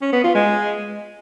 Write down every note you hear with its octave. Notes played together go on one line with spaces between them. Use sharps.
C#4
B3
F4
G#3